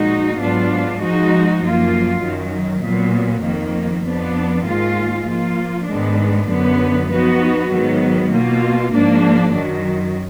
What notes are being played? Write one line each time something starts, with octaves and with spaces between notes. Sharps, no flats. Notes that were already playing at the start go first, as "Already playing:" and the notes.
Already playing: A#2 F3 G#3 D#4 F#4
G#2 F#3 B3 D4 F4
F3 G#3 D#4 F#4
F#2 F3 A#3 F4
F#2 D#3 F#3
A#2 F#3 B3
F2 D#3 A#3
F2 F3 B3 D4
G#2 D#3 A#3 F4
F3 A#3 F4
G#2 D#3 G#3 B3 D4
F#2 D3 F#3 B3
F3 B3 D#4 F#4
G#2 D#3 F#3 B3
B2 A#3 F4
G#2 F3 A#3 D4
F#2 D#3 F#3